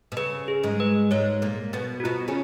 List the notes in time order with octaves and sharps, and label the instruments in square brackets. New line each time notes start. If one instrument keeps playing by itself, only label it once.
[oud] B2
[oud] C#3 [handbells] B4
[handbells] G#4
[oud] G#2 G#3
[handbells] B4
[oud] G#2 G#3 [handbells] C#5
[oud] A#2 A#3
B2 B3
[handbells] F#4
[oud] B2 B3 [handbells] F4
[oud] C#3 C#4